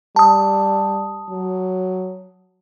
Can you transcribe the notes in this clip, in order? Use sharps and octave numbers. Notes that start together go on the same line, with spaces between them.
G3 A5 D#6
F#3